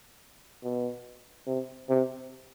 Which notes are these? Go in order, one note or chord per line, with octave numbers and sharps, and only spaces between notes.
B2
C3
C3